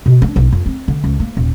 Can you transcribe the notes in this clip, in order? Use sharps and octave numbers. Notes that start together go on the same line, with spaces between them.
B2
D4
B1
F2
C4
D3
C#2
A#3
D#1